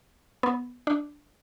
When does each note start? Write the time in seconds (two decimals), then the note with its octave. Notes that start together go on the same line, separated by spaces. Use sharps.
0.43 B3
0.87 D4